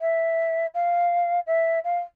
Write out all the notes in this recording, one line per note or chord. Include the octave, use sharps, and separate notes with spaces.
E5
F5
E5
F5